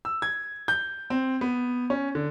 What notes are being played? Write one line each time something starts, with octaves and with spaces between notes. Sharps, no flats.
E6
G#6
G6
C4
B3
C#4
D3